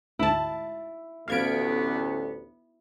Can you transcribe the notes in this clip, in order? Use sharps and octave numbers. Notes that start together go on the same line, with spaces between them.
D2 G#2 E4 A5
A1 D2 B3 F5 G#6 D7